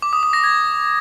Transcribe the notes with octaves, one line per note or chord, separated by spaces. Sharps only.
D6
D#6
D#6
A#6
G#6